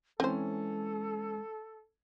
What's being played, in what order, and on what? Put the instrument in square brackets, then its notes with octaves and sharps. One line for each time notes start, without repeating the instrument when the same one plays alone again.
[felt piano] E3 C#4 [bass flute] G#3 [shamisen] C4 C5 [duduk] A4